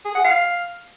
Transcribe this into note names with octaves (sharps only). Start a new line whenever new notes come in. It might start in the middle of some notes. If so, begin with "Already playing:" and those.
G#4
F#5
F5